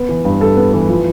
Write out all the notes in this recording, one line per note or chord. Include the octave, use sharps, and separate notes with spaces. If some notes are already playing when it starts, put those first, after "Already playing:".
Already playing: B3
E3
G2
G2 A4
B3
E3
F3